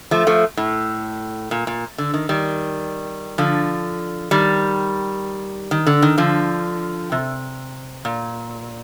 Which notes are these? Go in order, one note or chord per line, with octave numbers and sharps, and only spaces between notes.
F3 A3
F3 A3
A2
A#2
A#2
D3
D#3
D#3 G3
D3 F3
D#3 G3
D#3
D3
D#3
D3 F3
C3
A#2